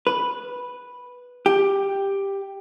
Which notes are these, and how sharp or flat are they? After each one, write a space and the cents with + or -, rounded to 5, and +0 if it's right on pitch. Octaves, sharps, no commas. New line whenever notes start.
B4 -5
G4 +10